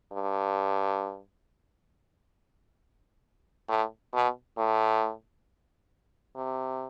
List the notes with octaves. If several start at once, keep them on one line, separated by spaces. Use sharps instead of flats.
G2
A2
B2
A2
C3